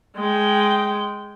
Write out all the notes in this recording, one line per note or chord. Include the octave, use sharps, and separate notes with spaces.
G#3 G5